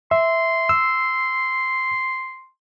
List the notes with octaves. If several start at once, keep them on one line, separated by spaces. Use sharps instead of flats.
E5 C6
E6